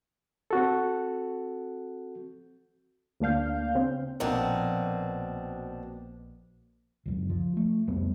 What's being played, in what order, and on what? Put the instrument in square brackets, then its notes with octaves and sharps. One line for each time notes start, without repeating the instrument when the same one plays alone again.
[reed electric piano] C4 F#4 A4
[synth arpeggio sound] D2 A#3 D4 F5 G6
C#3 C4
[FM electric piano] A#1 A#3 [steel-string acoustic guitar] B2 C4 D4
[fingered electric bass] C#2 F#2
F3
A3
C2 F2 G3 B3